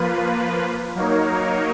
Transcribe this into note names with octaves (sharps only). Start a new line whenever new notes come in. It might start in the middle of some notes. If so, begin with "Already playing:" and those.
Already playing: F3 A#3 F4 B4
F#3 A#3 D#4 A#4 C#5